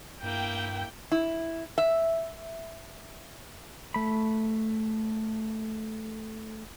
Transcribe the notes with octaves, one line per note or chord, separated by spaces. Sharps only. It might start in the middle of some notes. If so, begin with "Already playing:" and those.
G2 A#3 E4 G5
E4
E5
A3 B5